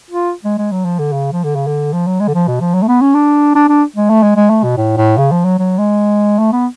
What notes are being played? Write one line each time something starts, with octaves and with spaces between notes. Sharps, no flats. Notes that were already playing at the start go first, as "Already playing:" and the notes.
F4
G#3
G#3
F#3
F3
D3
C#3
F3
D3
C#3
D3
F3
F#3
G#3
D3
F3
B2
F3
F#3
A3
B3
C#4
D4
D4
D4
G#3
A3
G#3
G#3
A3
B2
A2
A2
C#3
F3
F#3
F#3
G#3
A3
B3